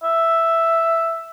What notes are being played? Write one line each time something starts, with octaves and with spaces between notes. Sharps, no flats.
E5